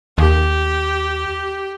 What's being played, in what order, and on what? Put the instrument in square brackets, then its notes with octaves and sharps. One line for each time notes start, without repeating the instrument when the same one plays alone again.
[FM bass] D#2 [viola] G4